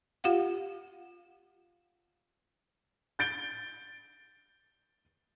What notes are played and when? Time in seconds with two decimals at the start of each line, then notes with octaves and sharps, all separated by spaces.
0.24 F4 G4 F5 F#5
3.19 G6 A6 D7 G7